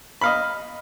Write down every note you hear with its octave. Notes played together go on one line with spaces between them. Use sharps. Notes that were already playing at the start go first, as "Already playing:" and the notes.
D#5 F5 B5